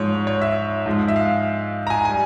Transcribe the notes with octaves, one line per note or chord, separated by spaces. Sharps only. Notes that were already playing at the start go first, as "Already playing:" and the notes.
Already playing: G#2 F3 G#3 C#5
C#5
E5
G#2 F3 G#3
E5
F5
A#5
G#5
G3 G#5